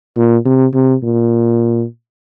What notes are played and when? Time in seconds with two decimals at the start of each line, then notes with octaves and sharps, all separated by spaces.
0.17 A#2
0.46 C3
0.74 C3
1.04 A#2